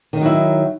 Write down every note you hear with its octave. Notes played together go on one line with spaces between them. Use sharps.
D#3 F#3 D#4 E4